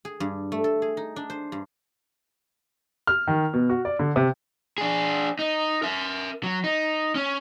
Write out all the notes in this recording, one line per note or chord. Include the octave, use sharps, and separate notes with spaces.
G#4
G2
A3
A4
G#4
D#4
D4
C5
G2
F6
D#3
B2
F#4
D5
D3
C3
D4 G#4
D#4
A#4 E5
F#3
D#4
C#4